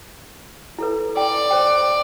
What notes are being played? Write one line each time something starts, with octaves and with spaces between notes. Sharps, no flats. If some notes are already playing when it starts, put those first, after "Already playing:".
E4 A4 B4
D5 G5
C5 G5